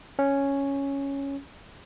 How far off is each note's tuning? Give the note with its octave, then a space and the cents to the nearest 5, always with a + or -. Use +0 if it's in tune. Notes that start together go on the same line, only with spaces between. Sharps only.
C#4 +0